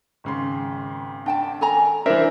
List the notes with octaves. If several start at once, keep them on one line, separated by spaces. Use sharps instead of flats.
G#1 C#3 C6
D4 G5 A5
A4 G#5 A#5
E3 D4 A#4 C5 E5